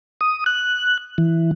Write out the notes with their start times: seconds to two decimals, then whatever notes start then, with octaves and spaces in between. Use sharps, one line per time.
0.21 D#6
0.46 F#6
1.18 E3